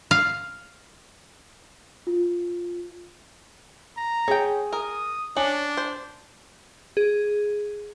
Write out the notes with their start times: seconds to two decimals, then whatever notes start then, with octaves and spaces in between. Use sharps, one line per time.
0.11 F5
2.07 F4
3.97 A#5
4.28 C#4 G#4 G5
4.73 A#4 D#6
5.37 C#4 D4 F#7
5.77 C5
6.97 G#4